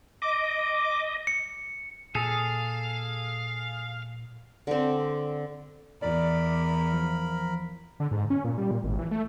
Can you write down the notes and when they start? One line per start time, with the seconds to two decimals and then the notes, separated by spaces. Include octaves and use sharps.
0.22 D#5 D6
1.27 C#7
2.15 A#2 G#4 A4 F5
4.67 D3 C4
6.02 E2 A#4 D5 B5
6.93 F3
8.00 D3
8.11 G#2
8.30 C#4
8.44 A#2
8.58 G3
8.71 A#2
8.84 G#1
8.99 E3
9.11 A3